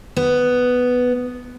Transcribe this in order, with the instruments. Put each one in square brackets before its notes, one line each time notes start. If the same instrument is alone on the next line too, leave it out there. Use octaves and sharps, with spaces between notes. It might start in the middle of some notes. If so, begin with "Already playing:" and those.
[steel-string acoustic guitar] B3